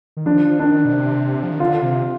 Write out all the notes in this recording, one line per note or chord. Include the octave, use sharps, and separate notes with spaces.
D#3
F3 D4
D#3 D4
B2
C3
F3
D#3
D3 F4
C3